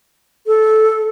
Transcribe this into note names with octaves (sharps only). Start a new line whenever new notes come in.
A4